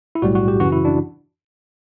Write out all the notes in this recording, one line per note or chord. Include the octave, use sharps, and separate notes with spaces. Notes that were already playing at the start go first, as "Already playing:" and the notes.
E4
B1 A2 G3 F#4
F#4
G4
F#2 C#3 E3 F#4
E4
D4